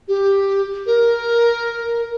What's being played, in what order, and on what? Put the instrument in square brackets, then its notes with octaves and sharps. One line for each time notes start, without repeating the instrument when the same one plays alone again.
[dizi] G4
A#4